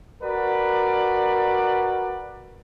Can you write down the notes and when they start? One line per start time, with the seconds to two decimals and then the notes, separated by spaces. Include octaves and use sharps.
0.22 F#4 A#4 B4 D5